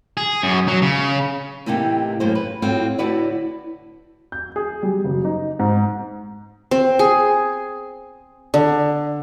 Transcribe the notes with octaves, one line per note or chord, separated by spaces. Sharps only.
G#4
F#2
F#3
C#3
A2 C3 E3 A#3 D#4 G4
F#2 A2 A#3 C5
B4
A2 C4 F4 F#4
A2 D3 E4 F#4 B4 D5
G6
G#4
G3
F#1
D#4
G#2
C4
G#4
D3